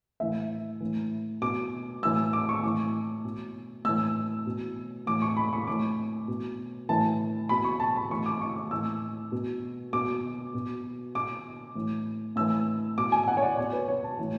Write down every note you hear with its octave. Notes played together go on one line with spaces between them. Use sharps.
A2 E3 E5
A2 E3
B2 D6
A2 E3 E6
D6
C#6
A2 E3 D6
B2
A2 E3 E6
B2
A2 E3 D6
C#6
B5
C#6
A2 E3 D6
B2
A2 E3 A5
B2 B5
C#6
A5
B5
A2 E3 C#6
D6
C#6
D6
A2 E3 E6
B2
B2 D6
B2
B2 D6
A2 E3
A2 E3 E6
B2 D6
G#5
F#5
C#5
D5
B2 C#5
B4
C#5
A5
A2 E3